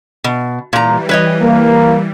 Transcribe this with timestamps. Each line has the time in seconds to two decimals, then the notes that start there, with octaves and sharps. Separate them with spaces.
0.24 B2
0.73 A#2 E3 G3 A#5
1.09 B4 C#5 D#5
1.41 A#3